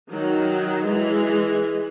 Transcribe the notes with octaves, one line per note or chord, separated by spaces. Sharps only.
D#3 F#3
E3 G#3